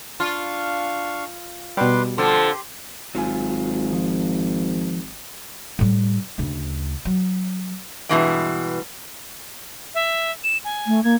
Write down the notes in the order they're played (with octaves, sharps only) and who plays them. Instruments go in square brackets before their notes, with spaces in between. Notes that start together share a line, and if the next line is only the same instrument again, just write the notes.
[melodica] D4 F5 C#6 [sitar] F4
[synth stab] B2 G3 [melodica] B4 C6 D6
[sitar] F2 D3 F3 [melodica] G4 C6 [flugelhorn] A4
[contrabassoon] G#1 [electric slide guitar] F#3 F4 G#5
[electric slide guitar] F3
[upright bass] A2 G3
D2 C#3
F#3
[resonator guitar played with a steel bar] G2 B2 E3 G#3
[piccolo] E5
E7
G#5
[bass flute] A3
[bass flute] A#3 [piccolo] G#6